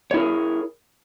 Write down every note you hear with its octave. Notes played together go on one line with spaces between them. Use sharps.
E4 G#4 A#4 C#5